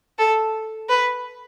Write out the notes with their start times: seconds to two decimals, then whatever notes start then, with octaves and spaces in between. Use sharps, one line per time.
0.18 A4
0.89 B4